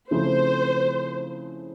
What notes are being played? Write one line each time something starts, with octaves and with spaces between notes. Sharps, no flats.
C#3 F3 A3 C4 E4 C5